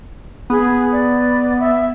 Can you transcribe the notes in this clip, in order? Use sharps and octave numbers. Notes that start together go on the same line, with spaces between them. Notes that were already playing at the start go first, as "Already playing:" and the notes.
B3 G#4
D5
E5